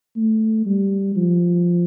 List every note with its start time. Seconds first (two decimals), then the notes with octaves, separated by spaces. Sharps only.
0.16 A3
0.66 G3
1.16 F3